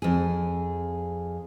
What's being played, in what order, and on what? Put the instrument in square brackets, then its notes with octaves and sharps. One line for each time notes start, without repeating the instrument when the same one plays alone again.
[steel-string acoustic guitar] F2 G#4